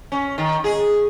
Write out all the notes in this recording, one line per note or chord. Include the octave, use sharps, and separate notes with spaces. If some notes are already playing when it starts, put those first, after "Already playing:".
C#4
D#3
G#4